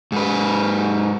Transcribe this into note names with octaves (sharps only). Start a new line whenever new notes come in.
G#2 B4